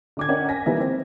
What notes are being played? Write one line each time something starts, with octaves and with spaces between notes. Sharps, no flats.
D3 D6 G#6
C#4 A#4 D5 D#5 F#5 G5
G#5 A#6 B6
E3 G3 A#3 B3 D#4 E4
C4